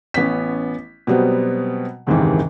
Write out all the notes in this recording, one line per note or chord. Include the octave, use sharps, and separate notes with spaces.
A1 B3 C#4 B6
B2 F#3 G3 B3 C4
F#1 D#2 G#2 C3 D#3 E3